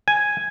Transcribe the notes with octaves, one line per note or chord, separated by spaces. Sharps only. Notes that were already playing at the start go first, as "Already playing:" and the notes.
G#5